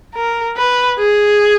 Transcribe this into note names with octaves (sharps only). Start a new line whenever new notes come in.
A#4
B4
G#4